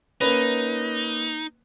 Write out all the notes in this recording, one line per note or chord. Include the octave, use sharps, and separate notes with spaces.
A#3 C#4 D#4 B4